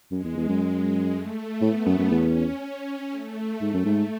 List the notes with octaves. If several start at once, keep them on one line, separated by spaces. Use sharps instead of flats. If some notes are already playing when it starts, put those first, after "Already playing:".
F#2 G#3
E2
E2
F#2
A3
A2 B3
F#2
F#2
E2 C#4
C#4
A3
G#2 A3
F#2
G#2